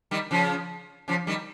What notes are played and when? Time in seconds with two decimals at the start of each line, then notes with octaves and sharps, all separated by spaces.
0.11 D#3 G3
0.31 C#3 F3
1.08 C#3 F3
1.27 D#3 G3